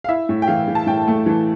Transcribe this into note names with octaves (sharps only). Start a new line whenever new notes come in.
F5
E4 E5
A2
G5
E3 F5
E3
A5
A2 G5
A3
E3